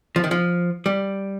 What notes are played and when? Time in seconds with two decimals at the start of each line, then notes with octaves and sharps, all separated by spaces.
0.16 F3
0.24 D#3
0.31 F3
0.86 G3